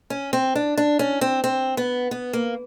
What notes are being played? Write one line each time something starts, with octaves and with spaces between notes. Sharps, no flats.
C#4
C4
D4
D4
C#4
C4
C4
B3
B3
A#3